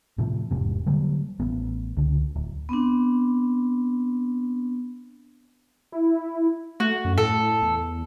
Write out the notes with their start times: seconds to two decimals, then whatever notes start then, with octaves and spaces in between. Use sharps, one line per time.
0.18 A2 C3 F3
0.51 E1 G#2 C3
0.86 D3 F#3 G3 A#3
1.40 A1 B3
1.97 C#2 D3
2.35 D1
2.69 B3 C4 D4
5.92 E4
6.80 A3 F#4
7.05 F#2
7.18 A2 A4
7.62 E2